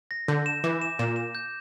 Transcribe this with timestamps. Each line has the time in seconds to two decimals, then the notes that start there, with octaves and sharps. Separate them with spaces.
0.11 A#6
0.28 D3 G6
0.46 E7
0.64 E3 D6
0.82 E7
0.99 A#2 E7
1.16 E7
1.35 G6